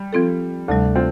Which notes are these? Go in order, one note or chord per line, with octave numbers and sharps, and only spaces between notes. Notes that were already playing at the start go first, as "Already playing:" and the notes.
Already playing: G3
F3 C4 F4 A4
D2 C3 G3 A3 D4
C4 F4